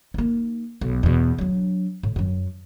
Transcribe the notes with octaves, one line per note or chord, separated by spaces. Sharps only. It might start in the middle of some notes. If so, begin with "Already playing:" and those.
A#3 D#4
B1
E2 B2
F#3 D4
A2
F#2 F#3